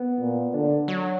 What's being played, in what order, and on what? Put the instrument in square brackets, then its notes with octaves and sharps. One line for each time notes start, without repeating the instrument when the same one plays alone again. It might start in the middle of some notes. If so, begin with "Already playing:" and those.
Already playing: [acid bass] B3
[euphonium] A#2
[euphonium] D3 [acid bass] D4
[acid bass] F#3